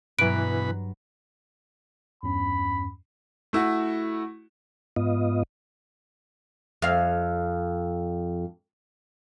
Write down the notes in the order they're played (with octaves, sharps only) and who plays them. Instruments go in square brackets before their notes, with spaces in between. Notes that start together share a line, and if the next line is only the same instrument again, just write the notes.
[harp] G2 F#3 A#5 [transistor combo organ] B2 B5 [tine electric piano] E3 F#6 [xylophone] D7
[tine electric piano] E2 G2 C#4 [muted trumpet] B5
[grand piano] A3 E4 F#4
[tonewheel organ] G#2 B3 F4 D#5
[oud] F2 F5